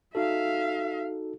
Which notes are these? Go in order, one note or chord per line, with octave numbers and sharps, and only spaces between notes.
D#4 F#4 A4 E5 F5